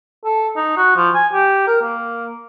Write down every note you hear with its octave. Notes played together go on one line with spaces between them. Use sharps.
A4
D#4
F#4
F3
G#5
G4
A#4
A#3